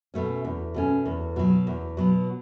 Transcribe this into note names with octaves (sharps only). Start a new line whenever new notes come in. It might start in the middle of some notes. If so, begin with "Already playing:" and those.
B2 A3 C#4
E2
B2 A3 C#4
E2
B2 F#3
E2
B2 F#3